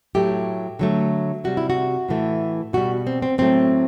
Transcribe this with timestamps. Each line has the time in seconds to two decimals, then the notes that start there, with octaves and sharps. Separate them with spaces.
0.15 A2 F#3 A3 G4
0.79 D3 F#3 A3
1.44 C3 G3 F#4
1.57 E4
1.70 F#4
2.09 A2 E3 A3
2.73 B2 G3 F#4
3.07 C4
3.22 C4
3.38 A2 F#3 A3 C4